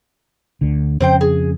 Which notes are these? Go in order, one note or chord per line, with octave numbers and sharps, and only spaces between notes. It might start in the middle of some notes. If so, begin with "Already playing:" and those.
D2 D3
F2 C#3 C4 C5 G5
G#4